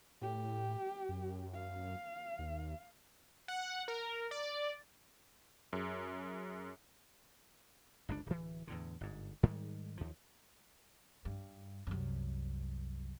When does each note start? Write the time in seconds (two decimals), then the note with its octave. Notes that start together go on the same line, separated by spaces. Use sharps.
0.22 A2 G4
1.09 F#2
1.54 F5
2.39 D#2
3.48 F#5
3.88 A#4
4.31 D5
5.73 F#2 G#4
8.09 G1 C#2 D3 D4
8.26 D1 E3
8.67 E2 A2 D3
9.01 G1 G#2
9.43 G#2 D#3 G3 G#3
9.97 D#2 F3
11.25 G2
11.87 C2 F#2